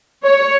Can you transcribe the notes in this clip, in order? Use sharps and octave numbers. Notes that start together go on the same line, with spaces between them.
C#5